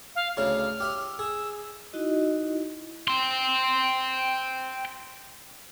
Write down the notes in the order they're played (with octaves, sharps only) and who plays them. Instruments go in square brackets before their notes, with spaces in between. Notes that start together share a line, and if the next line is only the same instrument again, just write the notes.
[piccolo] F5
[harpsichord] D2 C#3 E4 [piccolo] F6
[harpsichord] G4 E5
[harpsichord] G#4 [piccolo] E6
[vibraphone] D#4 E4 F#4 D#5
[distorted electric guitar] G5 C6